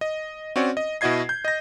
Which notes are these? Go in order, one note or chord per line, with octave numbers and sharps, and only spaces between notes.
D#5
C4 C#4 F#4 C#5 D5
D#5
B2 E4 F#4 D#5 G#6 C7
G6
D#5 A#6